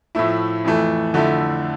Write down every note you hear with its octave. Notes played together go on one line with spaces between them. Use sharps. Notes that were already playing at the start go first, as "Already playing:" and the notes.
A2 F3 A3 E4
F2 E3 A3
F2 D3 A3 E4